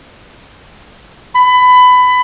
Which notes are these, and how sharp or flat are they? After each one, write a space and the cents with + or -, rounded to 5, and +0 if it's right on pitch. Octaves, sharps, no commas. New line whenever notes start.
B5 +20